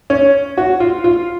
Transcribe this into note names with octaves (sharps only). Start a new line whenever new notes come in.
C#4
F#4
F4
F4